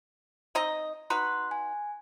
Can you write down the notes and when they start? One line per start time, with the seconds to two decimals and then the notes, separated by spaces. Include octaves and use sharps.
0.55 C4 D#4 D#5
1.10 D#4 F#4 B4 C6 F#6
1.51 G#5